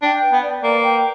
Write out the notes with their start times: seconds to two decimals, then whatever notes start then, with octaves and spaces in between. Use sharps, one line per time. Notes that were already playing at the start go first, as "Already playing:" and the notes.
0.03 D4 G5
0.23 B4
0.33 B3
0.42 D5
0.63 A#3 B4
0.83 G5